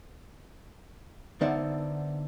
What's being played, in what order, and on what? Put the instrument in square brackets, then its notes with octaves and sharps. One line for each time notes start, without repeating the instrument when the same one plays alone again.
[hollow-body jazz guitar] D3 B3 D#4 C5 D5 E5